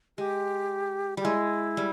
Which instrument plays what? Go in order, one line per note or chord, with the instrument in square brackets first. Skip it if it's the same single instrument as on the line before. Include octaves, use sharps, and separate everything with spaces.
[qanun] G#3 [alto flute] G4
[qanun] G3 [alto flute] G4
[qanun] G#3 [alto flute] E4
[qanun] G3